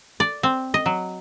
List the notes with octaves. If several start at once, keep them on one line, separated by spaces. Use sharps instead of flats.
D5
C4
D#5
F#3